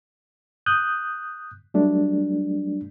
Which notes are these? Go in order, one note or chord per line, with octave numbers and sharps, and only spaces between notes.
D#6 F#6 G6
F#3 G3 A3 D4